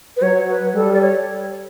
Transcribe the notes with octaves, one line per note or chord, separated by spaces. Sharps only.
B4
F#3 C#5
B4
G3 A4
D5
C#5